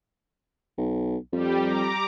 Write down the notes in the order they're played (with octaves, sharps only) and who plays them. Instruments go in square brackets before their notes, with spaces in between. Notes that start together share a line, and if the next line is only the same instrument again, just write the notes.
[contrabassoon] B1
[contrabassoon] F2 [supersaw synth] G3 G4
[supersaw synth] A#5 D6